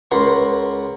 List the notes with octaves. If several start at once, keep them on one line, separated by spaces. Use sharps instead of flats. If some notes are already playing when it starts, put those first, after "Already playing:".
C#2 A#4 B4 F#5 C6